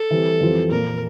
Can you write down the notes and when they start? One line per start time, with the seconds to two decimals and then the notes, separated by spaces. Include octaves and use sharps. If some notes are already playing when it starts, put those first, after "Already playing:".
Already playing: A4
0.11 E3 G3 C4
0.41 F2 E3 G3 C4 F4
0.71 A#2 F3 A#3 A#4